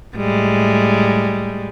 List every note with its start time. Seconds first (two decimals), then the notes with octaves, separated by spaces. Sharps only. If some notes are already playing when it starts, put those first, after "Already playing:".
0.17 A2 G3 G#3